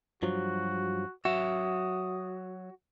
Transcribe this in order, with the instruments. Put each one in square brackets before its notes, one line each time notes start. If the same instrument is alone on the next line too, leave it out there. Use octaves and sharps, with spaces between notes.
[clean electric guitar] G2 F3 F#3 [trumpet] F#4
[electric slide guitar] F#3 E5 [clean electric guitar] F#4 [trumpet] D#6